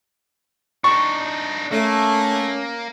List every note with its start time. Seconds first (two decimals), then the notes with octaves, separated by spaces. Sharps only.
0.84 D4 D#4 C#6
1.72 A3 A#3 C#4